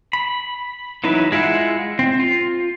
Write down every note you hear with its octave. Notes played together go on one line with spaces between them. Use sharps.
B5
E3 F#3 D#4 E4 B4
G#3 E4 F4 E5 F#5
C4
F4